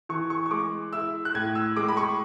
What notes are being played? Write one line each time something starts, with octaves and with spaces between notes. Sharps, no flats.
E3 C#6
C#6
C#6
G#3 D6
E4 E6
F#6
A2 G#6
E6
G#3 D6
B5
C#6